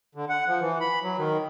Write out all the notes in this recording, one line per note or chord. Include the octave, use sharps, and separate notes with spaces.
D3
F#5
F3
E3
B5
F#3
D#3